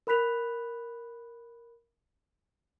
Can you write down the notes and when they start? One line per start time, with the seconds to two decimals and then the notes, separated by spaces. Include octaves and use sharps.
0.07 A#4 B5 F#6 B6 F7